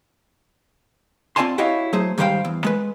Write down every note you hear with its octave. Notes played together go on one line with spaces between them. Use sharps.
C4 F4 D5 G#5 A5 C6
E4 F#4 G4 C#5 D#5 F5
F#3 A3 G#4 C5
G#2 D#3 G3 C5 F5 G5
E2
G#3 B4